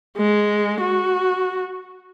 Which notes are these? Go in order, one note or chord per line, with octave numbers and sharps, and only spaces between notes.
G#3
F#4